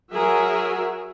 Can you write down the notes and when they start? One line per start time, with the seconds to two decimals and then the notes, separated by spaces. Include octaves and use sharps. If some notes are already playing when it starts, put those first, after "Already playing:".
0.12 F#3 F#4 G#4 A#4 E5